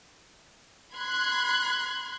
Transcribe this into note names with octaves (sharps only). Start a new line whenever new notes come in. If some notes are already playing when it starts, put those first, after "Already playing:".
B5 C6 F#6 G#6